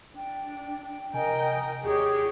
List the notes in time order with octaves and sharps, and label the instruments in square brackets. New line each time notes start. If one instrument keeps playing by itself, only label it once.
[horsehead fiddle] D4 [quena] G5
[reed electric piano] C3 G#5 [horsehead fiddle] A#4 G5 [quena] D#5
[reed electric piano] D#2 [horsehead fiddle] G4 C#5 [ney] G#4 [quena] D5